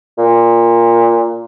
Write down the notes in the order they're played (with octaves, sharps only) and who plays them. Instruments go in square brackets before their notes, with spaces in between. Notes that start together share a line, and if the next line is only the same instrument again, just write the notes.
[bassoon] A#2